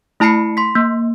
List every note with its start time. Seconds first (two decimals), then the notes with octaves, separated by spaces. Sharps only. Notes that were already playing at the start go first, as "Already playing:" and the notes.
0.20 A3 E4 A5 B5 C7 C#7
0.57 C6 B6
0.75 A#3